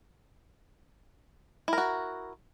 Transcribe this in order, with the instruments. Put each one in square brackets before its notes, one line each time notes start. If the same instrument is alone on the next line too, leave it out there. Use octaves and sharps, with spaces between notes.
[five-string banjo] E4
A#4
F#4